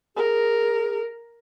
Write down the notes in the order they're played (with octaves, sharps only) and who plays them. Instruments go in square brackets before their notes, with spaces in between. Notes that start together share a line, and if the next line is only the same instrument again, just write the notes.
[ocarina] G#4 [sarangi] A#4